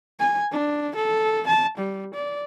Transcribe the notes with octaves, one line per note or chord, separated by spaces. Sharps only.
G#5
D4
A4
A5
G3
D5